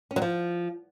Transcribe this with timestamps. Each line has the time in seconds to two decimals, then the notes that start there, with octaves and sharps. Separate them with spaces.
0.11 C#4
0.16 F#3
0.22 F3